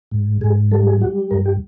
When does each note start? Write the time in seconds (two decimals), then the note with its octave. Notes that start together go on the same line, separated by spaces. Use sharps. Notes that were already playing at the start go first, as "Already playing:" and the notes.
0.12 G#2
0.41 G#2 G#4
0.71 G3 A4
0.87 G#4
1.01 G3 F#4
1.31 G2 A#4
1.46 G4